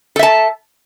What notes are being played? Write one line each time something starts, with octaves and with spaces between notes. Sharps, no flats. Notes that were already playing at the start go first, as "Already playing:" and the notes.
A4 E5 A5